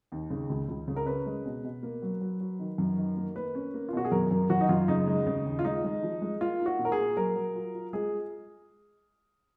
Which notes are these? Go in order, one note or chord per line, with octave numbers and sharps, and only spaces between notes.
D#2
C#3
C#2
C#2
C#3
A#4
C#4 B4
G#3
B2
B2
A#3
F#3
F#3
F#3
D#3
F#2
D#3
A#3
A#3 B4
C#4
A#3
F4
B2 F#4
G#4
F#2 A#4
F#2 A#4
F#2 F#4
D#4
F#2 F4
C#3 D#4
G#3
C#3
D#2
F4
G#3 D#4
G#3
F3
G#3
A#3 F4
D#4
F#4
A#2
A#4
G#4
A#3
F#3 A#4
F#3
F4
F4
G#3 G#4